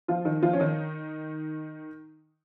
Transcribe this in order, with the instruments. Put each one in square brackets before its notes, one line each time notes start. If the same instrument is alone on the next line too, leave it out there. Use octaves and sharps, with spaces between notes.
[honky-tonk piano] F3 F4
D#3 D#4
F3 F4
C#4
D#3 D#4